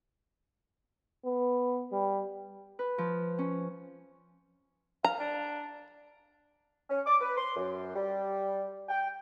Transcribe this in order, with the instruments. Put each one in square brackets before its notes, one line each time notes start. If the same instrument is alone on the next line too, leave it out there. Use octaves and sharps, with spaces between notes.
[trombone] B3
G3
[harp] B4
F3
C#4
[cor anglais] F5 [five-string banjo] A#5
[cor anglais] D4
[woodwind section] C#4
D6
B4
C6
F#2
G3
G5